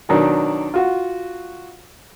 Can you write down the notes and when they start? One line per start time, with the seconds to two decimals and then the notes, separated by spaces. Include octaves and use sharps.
0.09 B2 D#3 F#3 D4
0.74 F4 F#4